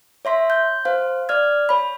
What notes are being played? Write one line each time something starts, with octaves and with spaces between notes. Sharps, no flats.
C#5 E5 C6 B6
G6
C5 F5
D5 F6 G#6
C#5 B5